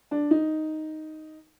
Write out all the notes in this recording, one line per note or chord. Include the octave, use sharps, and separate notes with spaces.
D4
D#4